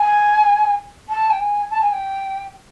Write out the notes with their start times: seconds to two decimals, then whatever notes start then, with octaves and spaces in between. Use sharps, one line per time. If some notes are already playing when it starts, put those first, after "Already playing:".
Already playing: G#5
1.09 A5
1.30 G5
1.40 G#5
1.70 A5
1.81 G#5
1.92 G5